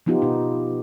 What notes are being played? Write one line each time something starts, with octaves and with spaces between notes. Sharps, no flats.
F3 B3 D#4 F4 G4
B2 D#4